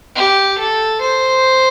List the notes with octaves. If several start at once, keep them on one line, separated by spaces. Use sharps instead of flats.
G4
A4
C5